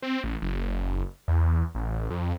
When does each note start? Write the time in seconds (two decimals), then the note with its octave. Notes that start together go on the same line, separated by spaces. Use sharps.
0.02 C4
0.24 A1
0.42 F#1
1.28 E2
1.75 A1
2.10 F2